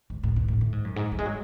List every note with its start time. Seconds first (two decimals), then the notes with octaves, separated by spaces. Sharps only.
0.10 G#2
0.23 A2
0.36 B2
0.48 A2
0.61 A2
0.72 G#2
0.84 F#2
0.96 G#2
1.12 F#3
1.19 G#3
1.26 F#3